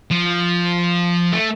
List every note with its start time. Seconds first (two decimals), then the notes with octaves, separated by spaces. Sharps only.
0.11 F3
1.32 A3